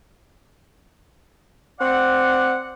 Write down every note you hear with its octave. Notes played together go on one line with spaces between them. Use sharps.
C4 D5 F#5